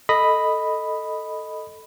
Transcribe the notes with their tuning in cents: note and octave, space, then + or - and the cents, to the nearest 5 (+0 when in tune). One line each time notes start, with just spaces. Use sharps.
A4 +0 D#5 +0 B5 +0